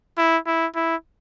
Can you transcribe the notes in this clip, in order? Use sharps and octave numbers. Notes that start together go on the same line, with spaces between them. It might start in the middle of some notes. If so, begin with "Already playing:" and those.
E4
E4
E4